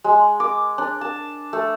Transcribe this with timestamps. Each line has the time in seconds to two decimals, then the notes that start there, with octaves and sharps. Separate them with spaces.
0.04 G#3
0.40 D6
0.78 D4
1.01 A5
1.53 A3